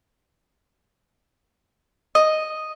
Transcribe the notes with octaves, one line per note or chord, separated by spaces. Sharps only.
D#5